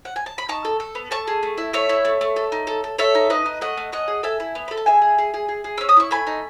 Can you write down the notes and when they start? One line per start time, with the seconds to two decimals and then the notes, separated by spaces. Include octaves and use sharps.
0.05 F#5
0.16 G#5
0.26 A5
0.38 B5
0.48 D#4 A5 C#6
0.65 A4
0.80 A4
0.95 B3
1.11 A3 A5 C#6
1.27 G#4
1.43 A3
1.58 E4
1.73 A3 C#5 E5
1.89 E4
2.05 A3
2.21 A3
2.36 A4
2.52 D#4
2.67 A4
2.84 A4
2.98 A4 C#5 E5
3.15 D#4
3.30 D#4 B4 D#5
3.46 D#4
3.61 A3 D#5 F#5
3.77 A3
3.92 C#4 D#5 F#5
4.08 G#4
4.23 A4 E5 G#5
4.40 E4
4.55 B3
4.68 A4 B5
4.77 A5
4.86 G#4 E5 G#5
5.02 G#4
5.18 G#4
5.34 G#4
5.48 G#4
5.64 G#4
5.78 C#4 E6
5.89 D#6
5.97 E4 C#6
6.11 A3 G#5 B5
6.27 D#4